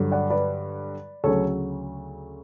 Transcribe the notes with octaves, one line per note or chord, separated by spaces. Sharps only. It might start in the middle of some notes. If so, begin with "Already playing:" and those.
Already playing: G2 D3 F#3
D5 F#5
B4 D5
D2 C#3 F#3 A4 C#5